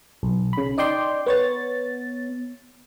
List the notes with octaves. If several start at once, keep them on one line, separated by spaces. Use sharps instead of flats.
B1
C#3 B5
D#4 D5 G5 C6
B3 C#5 A6